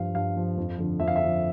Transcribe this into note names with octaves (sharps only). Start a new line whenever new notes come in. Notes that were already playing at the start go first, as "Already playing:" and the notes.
Already playing: G2 F3 F5
G2 F5
F3
F2
D3 F3
F2 E5
F5
E5
D3 F3